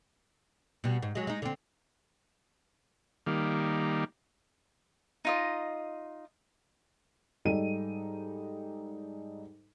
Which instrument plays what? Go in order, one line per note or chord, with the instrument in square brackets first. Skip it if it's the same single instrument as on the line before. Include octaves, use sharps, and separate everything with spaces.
[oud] B2 G3
G#2
F#3 G#3
G#3 D#4
D3 C4
[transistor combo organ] D#3 G3 A#3
[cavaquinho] D#4 F4 D#5
[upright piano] G#2 G3 D#4 A4 D#5 D#7